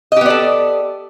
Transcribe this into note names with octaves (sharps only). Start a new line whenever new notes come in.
B3 G4 A4 D5 D#5